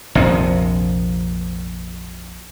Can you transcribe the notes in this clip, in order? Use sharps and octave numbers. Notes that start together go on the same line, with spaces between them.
A#1 F2 C3